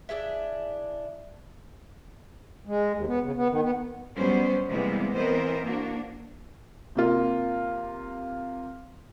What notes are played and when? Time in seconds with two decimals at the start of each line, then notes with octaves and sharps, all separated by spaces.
0.09 D4 E4 G#4 E5
2.67 G#3
2.94 D#2
3.07 B3
3.23 C#3
3.37 B3
3.50 D#3
3.62 B3
4.17 F#3 G3 B3 C#4 C5
4.69 C3 E3 G3 G#3 A#3 B3
5.16 E3 B3 C4 A#4 C5 D#5
5.64 A#3 D4 F#4
6.95 C3 A#3 F4